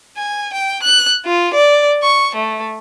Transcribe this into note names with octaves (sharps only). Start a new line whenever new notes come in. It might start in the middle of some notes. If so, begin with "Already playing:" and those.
G#5
G5
F#6
F4
D5
C#6
A3